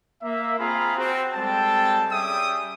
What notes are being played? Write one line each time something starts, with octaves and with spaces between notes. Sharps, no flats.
A#3 E5
C4 F4 G#4 F5 A#5 B5
C4 F#4
G3 G#3 C4 A4 G5 A5
G3 C#4 G#4 E5 G5 D#6